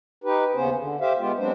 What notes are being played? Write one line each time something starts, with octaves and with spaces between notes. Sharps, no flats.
D#4 G4 B4
D#2 C#3 B3 C#4 C5
D3
G4 C5 E5 F5
G#3 B3 F4 G4
F#3 G#3 B3 C4 D4 C5